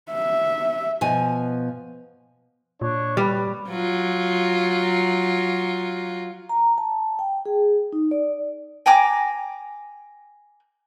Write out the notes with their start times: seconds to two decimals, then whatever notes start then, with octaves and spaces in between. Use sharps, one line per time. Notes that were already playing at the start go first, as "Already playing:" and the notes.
0.12 E5
1.01 B2 F3 G#5
2.81 A#2 D4 C#5
3.17 G3 B4
3.69 F#3 F4
6.49 A#5
6.78 A5
7.19 G5
7.45 G#4
7.93 D#4
8.11 D5
8.86 G5 G#5 A#5 D6